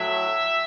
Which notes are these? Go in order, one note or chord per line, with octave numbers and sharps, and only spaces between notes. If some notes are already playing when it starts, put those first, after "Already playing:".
Already playing: A2 F#3 E5